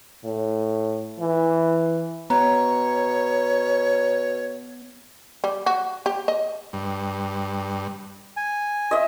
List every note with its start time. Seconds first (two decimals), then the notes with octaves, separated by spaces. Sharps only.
0.25 A2
1.20 E3
2.30 B2 B3 C#5 A#5
5.44 G3
5.66 F#4
6.06 G4
6.28 D#5
6.73 G2
8.37 G#5
8.91 D#5 E5